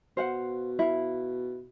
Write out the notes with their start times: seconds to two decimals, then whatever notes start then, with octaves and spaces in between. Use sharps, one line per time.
0.17 B2 C5 F5 F#5
0.79 E4 F5